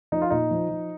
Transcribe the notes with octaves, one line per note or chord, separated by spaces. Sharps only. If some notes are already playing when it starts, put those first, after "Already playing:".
F3 D#4
F4
A#2 D#4
F3
F3